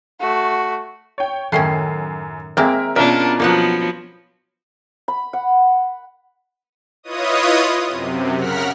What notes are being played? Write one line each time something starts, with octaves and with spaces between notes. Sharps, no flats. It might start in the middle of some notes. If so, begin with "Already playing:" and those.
A3 F#4
C#5 G5
F#2 A2 D#3 C#4 C7
G#3 A#3 C4 A#4 E5
B2 C#4 D4 F4 A#4 E5
F3 F#3 A#3 B3 D#4 F#5
B5
F#5
E4 F4 B4 C#5 D#5 D#6
F#2 C3
C#3 A#4 F#5 F6 B6